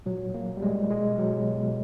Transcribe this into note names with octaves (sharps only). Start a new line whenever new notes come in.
A#2 F#3
A#2
A#3
A#2
G3
G#3
A#2
B2 G#3
B2
F#3
B2
B2